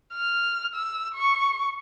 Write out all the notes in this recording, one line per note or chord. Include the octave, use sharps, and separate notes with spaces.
F6
E6
C#6